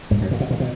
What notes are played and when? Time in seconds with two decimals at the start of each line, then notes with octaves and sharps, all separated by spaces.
0.11 G#2
0.21 F#2
0.31 A#2
0.40 B2
0.51 A#2
0.60 B2